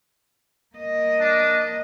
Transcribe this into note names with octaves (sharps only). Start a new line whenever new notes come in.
A#3 D#5
D4